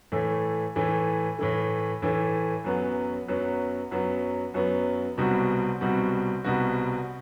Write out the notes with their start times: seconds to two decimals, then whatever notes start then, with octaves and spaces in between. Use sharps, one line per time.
0.12 A2 E3 A3
0.76 A2 E3 A3
1.39 A2 E3 A3
2.02 A2 E3 A3
2.64 F#2 F#3 B3
3.28 F#2 F#3 B3
3.91 F#2 F#3 B3
4.54 F#2 F#3 B3
5.18 C2 B2 G3 C4 F#4
5.81 C2 B2 G3 C4 F#4
6.44 C2 B2 G3 C4 F#4